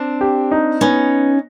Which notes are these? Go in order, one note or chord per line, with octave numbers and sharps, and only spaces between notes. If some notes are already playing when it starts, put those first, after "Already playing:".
Already playing: C4 D4
G4
D#4
B3 C#4 D#4